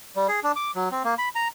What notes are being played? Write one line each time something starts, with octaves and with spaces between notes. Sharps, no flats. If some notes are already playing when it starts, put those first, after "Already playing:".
G3
G#4
D4
D6
F#3
C4
A#3
B5
A#5